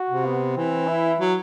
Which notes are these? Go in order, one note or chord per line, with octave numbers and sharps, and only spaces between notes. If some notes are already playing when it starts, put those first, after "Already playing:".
Already playing: F#4
C3
B3
E3 C4
E4
F#3